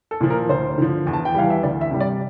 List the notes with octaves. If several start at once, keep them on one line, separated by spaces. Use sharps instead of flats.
A4
A#2 F3
A#4
D2 C5
D3 F3
E2
A5
G5
E3 G3 F5
E5
D2 D5
E5
C3 G3
D5